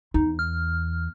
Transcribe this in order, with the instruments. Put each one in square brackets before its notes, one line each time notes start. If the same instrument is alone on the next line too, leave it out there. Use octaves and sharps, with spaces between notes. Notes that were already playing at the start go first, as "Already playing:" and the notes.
[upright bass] E2 [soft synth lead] D#4
[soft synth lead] F6